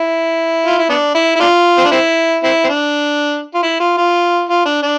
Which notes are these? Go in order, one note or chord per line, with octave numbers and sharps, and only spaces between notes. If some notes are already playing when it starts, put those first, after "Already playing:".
Already playing: E4
F4
E4
B3 D4
E4
E4
D4 F4
C4
D4
C4 E4
C4 E4
C4
D4
F4
E4
F4
F4
F4
D4
D4